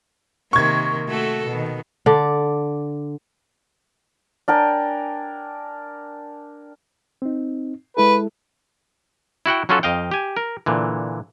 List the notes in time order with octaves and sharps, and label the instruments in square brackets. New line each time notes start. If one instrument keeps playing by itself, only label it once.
[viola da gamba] C3 D#3 A#3 [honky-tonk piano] C#6 G#6
[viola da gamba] A3 F#4 A4
B2 D#3
[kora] D3 D5
[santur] D4 A#4 G5 G#5
[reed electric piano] C4 D#4
[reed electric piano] G#3 E4 A4 [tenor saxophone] B4
[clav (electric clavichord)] E4 F#4 F#5 G5
F#3 C#4 F4 F#4 A4
F2 D#5 F5 G5
G4 G#5
A#4
A#2 D3 E3